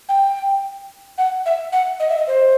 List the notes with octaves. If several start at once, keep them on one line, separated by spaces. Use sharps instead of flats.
G5
F#5
E5
F#5
D#5
E5
D#5
C5